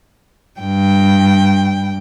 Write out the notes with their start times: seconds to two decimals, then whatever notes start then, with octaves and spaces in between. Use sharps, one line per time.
0.60 G2 G5